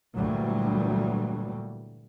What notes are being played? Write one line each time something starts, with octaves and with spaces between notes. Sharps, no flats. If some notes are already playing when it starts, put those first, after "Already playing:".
D2 G2 A#2 E3 F#3 G3